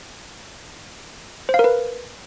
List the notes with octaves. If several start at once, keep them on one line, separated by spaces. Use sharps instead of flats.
C5
F5
A#4
B4